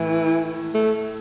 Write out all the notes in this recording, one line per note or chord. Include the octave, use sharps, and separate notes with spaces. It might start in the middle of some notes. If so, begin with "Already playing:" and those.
Already playing: A2 E3
A3